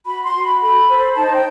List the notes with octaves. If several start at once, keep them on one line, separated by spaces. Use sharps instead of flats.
F#4 B5
C6
F#4
B5
A4 B5
C5
D#4 A5
G5